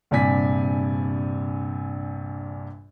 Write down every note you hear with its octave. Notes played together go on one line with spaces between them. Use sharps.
A#1 G2 C3 D5 G#5 B6